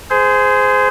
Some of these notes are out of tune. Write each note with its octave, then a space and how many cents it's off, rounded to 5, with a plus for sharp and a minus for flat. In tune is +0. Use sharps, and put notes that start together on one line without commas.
G#4 +10 C5 -20